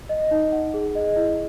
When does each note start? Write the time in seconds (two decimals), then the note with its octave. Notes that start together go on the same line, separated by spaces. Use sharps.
0.09 D#5
0.31 D#4
0.52 F#5
0.74 G#4
0.95 D#5
1.16 E4